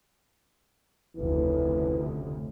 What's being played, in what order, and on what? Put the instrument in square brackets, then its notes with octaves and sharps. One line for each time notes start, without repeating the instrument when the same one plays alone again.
[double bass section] F1 D2 C#3 [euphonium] E3